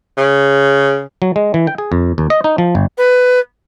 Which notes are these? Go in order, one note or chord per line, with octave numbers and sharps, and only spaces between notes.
C#3
F#3
G#3
E3
G5
G#4
F2
D#2
D#5
D#4
F3
G1
B4